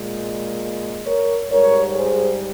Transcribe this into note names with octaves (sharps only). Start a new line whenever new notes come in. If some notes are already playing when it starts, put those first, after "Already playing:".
Already playing: A#2 G#3
A#4 C#5
G#2 G3 A#4 C#5
G#4 C5